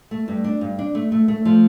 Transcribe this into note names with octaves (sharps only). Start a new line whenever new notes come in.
A3
G2
D4
G2
D4
A3
A3
A3
F3